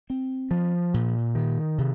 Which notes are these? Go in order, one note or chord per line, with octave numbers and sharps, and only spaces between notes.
C4
F3
A#2
D#3
C3